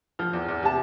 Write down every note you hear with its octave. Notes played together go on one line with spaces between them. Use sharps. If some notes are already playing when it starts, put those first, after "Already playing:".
F3 F6
E2
E2
C3 A5